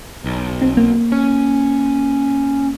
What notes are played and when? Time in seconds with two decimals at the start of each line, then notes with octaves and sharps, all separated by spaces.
0.24 B1
0.62 C4
0.77 A#3
1.12 C#4